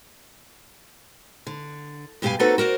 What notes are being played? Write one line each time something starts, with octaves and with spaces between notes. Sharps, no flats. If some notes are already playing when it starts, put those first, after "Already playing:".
D3
G2 B2 G4 B4 F5 G#5
A#3 C4 D#4 F#4 A4 B4
F#4 A#4 C5 D5